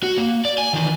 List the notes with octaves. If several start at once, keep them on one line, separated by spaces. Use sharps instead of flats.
F#4
A#3
D5
G#5
D#3 E3